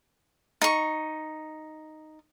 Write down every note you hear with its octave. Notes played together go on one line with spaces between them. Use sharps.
D#4 C#6